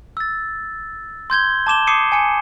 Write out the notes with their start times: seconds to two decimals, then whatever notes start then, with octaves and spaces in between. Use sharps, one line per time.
0.17 E6 A6
1.30 C6 G6 G#6 G7
1.67 A5 D6 E7 G7
1.87 D6 D#6 C7 C#7 D#7
2.12 G#5 C#7